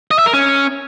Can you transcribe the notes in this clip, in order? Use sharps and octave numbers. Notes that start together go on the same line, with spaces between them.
D#5
E5
A#4
C#4